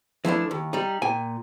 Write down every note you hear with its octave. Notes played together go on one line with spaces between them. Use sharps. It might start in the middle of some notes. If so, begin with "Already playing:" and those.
E3 F3 A3 D4
D#2
G3 D#4
A#2 G5 G#5